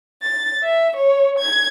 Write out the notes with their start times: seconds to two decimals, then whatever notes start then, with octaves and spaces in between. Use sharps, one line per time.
0.23 A6
0.63 E5
0.97 C#5
1.39 G#6